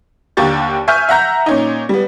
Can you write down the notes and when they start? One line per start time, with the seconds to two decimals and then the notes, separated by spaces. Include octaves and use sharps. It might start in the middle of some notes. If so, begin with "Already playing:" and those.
0.37 D#2 D3 A#3 G4 C#6 A6
0.88 E5 G#5 C#6 F6 G6
1.09 E5 F#5 A#5 G6
1.46 A#2 C#4 D#4
1.89 G3 B3